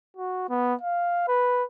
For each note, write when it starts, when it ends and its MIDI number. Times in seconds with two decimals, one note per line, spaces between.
0.17 0.49 66
0.49 0.74 59
0.81 1.27 77
1.28 1.63 71